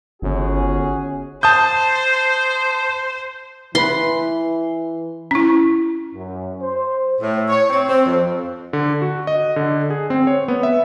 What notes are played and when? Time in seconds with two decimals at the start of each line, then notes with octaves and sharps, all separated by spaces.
0.22 G1 C#4 F#4 G#4
1.43 C5 A5 D#6 G6
3.75 E3 E4 B4 B5 C6
5.31 C#4 E4
6.15 F#2
6.62 C5
7.21 A2
7.48 C#5
7.69 C4
7.88 C4
8.06 F2
8.73 D3
9.02 F#4
9.27 D#5
9.56 D3
9.90 G#4
10.10 C4
10.27 C#5
10.48 B3
10.63 E5